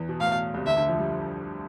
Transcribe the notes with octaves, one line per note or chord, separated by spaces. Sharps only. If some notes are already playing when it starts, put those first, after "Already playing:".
Already playing: E2 E3
B2
A2 F5
B2
C2 C3
D2 D3 E5
D2 D3
F2 F3
G3